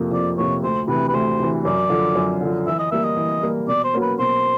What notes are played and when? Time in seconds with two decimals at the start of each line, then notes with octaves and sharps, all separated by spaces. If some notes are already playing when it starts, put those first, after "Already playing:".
Already playing: F2 C3 F3 A#3
0.11 F2 D5
0.38 C3 F3 A#3 C#5
0.63 D2 C5
0.88 C3 E3 B4
1.09 B4
1.14 D2 C5
1.39 C3 E3
1.64 F#2 D5
1.90 D3 F3
2.15 F#2
2.41 D3 F3
2.66 E3 E5
2.79 D#5
2.91 G3 A#3 E5
3.04 D#5
3.16 E3
3.43 G3 A#3
3.67 B2 D5
3.84 C5
3.94 F#3 A#3 C#4
4.02 B4
4.19 B2 C5